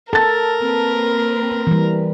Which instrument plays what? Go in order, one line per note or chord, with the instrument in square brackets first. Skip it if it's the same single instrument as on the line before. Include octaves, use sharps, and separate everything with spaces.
[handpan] A4 [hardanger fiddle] A#4 [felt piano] A5 A6
[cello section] A#3 C4 B4
[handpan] E3 G3